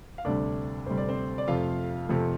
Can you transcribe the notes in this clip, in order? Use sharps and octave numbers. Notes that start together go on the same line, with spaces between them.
F5
D2 C3 G3 D4 D5
D2 C3 G3 C5
D5
C4 C5
D5
F2 C3 A3 F4 F5
F2 C3 A3